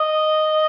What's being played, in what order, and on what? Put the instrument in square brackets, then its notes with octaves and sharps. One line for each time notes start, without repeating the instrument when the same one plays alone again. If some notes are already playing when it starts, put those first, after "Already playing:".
Already playing: [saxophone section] D#5